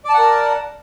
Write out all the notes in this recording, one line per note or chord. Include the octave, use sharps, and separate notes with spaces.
A#4 D5 F#5 A5